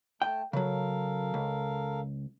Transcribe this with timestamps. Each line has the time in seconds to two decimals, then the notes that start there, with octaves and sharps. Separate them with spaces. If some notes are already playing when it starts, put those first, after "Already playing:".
0.22 A3 G5 A5
0.53 C#3 F#3 A4 A#4 F5
1.34 C#2